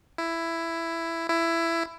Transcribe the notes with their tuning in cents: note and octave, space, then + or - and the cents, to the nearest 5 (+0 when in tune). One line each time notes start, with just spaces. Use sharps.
E4 +10
E4 +15